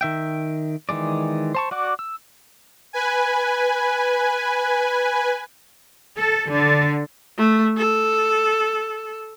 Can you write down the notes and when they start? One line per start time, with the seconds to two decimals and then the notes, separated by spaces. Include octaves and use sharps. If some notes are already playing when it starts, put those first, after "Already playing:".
0.01 D#3 E5 G5
0.89 D#3 E3 G#3 D5
1.55 C5 A5 C#6
1.71 F#4 D5 F#5 D6
1.99 E6
2.93 B4 G#5
6.15 A4
6.49 D3
7.37 A3
7.77 A4